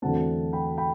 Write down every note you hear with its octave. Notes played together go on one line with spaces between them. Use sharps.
E2 D3 F#3 A3 C4 F#5 A5
G5 B5
G5 B5